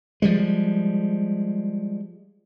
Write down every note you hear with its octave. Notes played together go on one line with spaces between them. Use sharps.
F3 G3 G#3